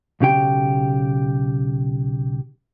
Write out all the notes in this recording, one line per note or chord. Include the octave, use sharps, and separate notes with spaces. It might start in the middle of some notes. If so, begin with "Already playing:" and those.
B1 C#3 G4 G5